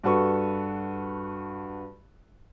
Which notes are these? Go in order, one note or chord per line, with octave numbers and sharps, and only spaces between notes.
G2 F#4 A4 B4 C#6